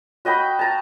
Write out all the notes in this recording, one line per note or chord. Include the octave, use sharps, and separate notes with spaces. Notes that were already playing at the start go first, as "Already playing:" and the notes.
F#4 D#5 G5 B5
A5 A#5